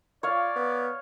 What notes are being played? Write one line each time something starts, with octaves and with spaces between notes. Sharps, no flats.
F4 C#5 D5 F5
B3